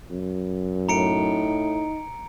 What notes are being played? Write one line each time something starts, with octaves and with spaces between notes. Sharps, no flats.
F#2
A2 D#4 A#5 C#7 D7